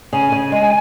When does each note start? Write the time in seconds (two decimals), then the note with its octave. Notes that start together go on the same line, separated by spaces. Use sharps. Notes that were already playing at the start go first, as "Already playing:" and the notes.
0.13 C#3 G#5
0.32 C#3
0.52 G#3